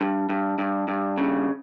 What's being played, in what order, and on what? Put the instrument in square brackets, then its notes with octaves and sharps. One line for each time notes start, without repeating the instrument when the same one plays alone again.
[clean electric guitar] G2
G2
G2
G2
C#3